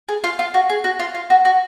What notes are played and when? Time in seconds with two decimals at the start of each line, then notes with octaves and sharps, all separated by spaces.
0.09 G#4
0.24 F4
0.39 F4
0.54 F#4
0.69 G#4
0.84 F#4
0.99 F4
1.14 F4
1.30 F#4
1.45 F#4